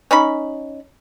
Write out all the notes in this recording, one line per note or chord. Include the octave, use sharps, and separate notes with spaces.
C#4 D#4 B5